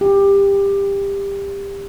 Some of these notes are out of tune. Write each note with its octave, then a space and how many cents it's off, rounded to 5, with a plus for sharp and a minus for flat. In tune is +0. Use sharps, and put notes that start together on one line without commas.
G4 +20